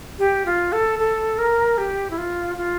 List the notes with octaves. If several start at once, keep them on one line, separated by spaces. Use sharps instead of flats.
G4
F4
A4
A4
A#4
G4
E4
F4
F4